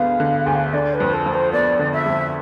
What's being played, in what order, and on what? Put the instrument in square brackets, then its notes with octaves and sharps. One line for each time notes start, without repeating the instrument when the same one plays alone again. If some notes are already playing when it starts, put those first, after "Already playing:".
Already playing: [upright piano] D2 D3 G#3 B3 [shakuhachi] F5
[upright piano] D3
[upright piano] D2 [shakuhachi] G#5
[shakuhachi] F5
E5
[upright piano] D3 [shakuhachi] D5
[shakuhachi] B4
[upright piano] F2
[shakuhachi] A4
[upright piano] F3
[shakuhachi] C5
[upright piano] B3 [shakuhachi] D5
[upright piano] D3
[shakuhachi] E5
[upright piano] F2